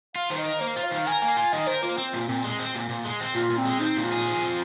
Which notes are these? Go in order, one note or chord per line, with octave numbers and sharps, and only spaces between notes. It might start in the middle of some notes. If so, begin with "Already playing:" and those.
F4 F5
D#3 C5
D#5
A#4
A#3 C5
F4
F5
D#3
A#4 G#5
A#3 G#5
F4 G#5
D#3 D#5
A#4 C5
A#3 F4
C4
A#2 F4
A#2 C4
G#3
C4
A#2
A#2
G#3
C4
A#2 F4
A#2
C4
G#3
C4 D#4
A#2
F4
G#4
F3
C4